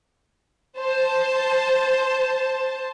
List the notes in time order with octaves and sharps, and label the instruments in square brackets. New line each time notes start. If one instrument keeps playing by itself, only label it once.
[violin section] C5 A5